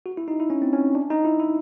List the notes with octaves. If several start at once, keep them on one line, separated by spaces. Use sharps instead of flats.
F#4
E4
D#4
E4
C#4
C4
C#4
D4
D#4
E4
E4